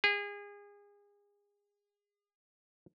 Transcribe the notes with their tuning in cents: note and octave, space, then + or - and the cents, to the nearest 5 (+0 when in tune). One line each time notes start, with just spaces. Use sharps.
G#4 -30